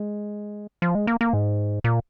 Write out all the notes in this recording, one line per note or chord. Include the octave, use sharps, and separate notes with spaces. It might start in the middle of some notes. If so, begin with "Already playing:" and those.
Already playing: G#3
F3
G#3
A#3
A#3
G#2
A#2